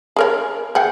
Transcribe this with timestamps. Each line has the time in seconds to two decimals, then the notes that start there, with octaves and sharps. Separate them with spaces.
0.16 G#4 A#4 C#5
0.75 G#4 F#5 G5